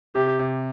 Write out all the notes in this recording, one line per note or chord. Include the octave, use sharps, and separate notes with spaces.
C3 G4
C3